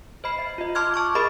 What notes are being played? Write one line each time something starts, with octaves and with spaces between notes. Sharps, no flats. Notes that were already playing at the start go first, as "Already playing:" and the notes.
C5 D#5 B5 C7
E5
F4 D#5
A5 C6 D6 F6 F#6 G#6
A5 C#6 D6
G#4 A#4 D#5 B5 A6 D7